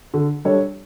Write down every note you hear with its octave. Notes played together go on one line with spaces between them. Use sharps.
D3
G3 D4 A4 C#5